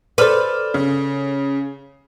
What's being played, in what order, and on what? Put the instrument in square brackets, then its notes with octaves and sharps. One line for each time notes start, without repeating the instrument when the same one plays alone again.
[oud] A4 B4 [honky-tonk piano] C5 D5 F6
[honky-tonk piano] C#3